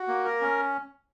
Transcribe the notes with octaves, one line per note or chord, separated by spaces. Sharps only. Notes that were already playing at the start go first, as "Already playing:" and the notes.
Already playing: F#4
A#3
A#4
C#4